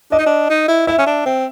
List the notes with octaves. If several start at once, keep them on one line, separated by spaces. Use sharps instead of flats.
D4 D#5
D#4
D4
D#4
E4
E4 E5
C#4
D4
C4